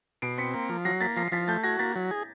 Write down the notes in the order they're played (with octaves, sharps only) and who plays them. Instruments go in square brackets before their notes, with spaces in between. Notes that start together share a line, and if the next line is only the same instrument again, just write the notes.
[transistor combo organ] B2 [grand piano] C7 D7
[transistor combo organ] C4 [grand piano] B6 C#7
[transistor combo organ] A#3
F3
[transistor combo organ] F#3 [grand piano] A#6 C7
[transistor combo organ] A#3 [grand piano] A6 B6
[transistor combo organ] F3 [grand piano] A#6 C7
[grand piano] C7
[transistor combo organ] F3 [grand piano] A6 B6
[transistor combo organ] A3 [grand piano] G6 A6
[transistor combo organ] F#4 [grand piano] G#6 A#6
[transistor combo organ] A#3 [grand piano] A6 B6
[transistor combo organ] F#3
G#4